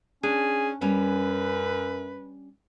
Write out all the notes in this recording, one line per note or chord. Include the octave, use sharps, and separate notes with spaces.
C#4 D4 G#4
F#2 G3 C#4 B4